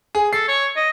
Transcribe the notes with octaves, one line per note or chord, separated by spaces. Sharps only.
G#4
A4 C7
C#5
D#5